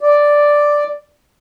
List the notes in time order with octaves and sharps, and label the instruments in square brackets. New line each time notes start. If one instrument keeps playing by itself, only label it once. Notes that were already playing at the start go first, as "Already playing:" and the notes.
[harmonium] D5